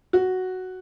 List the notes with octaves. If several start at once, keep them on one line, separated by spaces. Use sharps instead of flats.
F#4